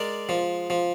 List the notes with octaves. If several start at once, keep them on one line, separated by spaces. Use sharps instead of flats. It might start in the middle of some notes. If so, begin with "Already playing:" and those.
Already playing: G#3 A#4 D5
F3
F3